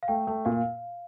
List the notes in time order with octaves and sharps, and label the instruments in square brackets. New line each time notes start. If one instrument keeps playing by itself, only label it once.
[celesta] F5
[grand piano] A3 [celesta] G5
[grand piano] A3
[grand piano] A#2 [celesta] F5